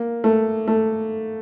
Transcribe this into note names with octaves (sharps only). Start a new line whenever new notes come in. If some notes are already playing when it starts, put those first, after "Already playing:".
Already playing: A#3
A3
A3